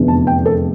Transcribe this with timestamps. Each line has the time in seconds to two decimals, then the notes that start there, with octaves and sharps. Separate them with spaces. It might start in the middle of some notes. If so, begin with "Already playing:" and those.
Already playing: F1 E2 D3 F3
0.08 A5
0.27 G5
0.45 A4